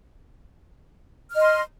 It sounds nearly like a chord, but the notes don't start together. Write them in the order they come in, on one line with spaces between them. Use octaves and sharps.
F6 D#5 C6